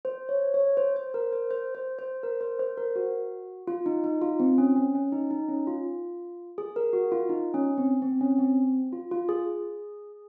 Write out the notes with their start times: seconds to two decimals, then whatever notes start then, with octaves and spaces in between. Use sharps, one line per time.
0.05 C5
0.29 C#5
0.54 C#5
0.77 C5
0.96 C5
1.14 A#4
1.33 C5
1.51 C5
1.75 C5
1.99 C5
2.23 A#4
2.41 C5
2.59 C5
2.77 A#4
2.96 F#4
3.67 F4
3.86 D#4
4.04 D#4
4.22 F4
4.40 C4
4.58 C#4
4.76 C#4
4.95 C#4
5.12 D#4
5.31 D#4
5.49 C#4
5.67 F4
6.58 G#4
6.76 A#4
6.93 F#4
7.12 F4
7.29 D#4
7.54 C#4
7.78 C4
8.02 C4
8.21 C#4
8.39 C4
8.93 F4
9.11 F4
9.29 G#4